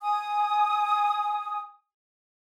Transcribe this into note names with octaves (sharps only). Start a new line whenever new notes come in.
G#5 D#6